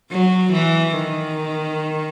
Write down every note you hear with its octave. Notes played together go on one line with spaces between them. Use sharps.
F#3
E3
D#3